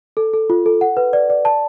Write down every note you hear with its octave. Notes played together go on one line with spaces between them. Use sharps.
A4
A4
F4
A4
F#5
B4
D5
D5
A5